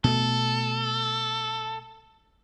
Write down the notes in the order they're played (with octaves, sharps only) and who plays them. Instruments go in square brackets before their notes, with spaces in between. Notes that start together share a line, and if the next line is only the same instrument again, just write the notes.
[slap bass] B2 A3 [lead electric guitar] A4